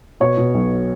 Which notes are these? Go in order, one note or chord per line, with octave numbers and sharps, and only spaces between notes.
B2 C#5
B2
B1